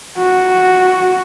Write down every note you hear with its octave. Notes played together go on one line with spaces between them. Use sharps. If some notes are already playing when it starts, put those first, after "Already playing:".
F#4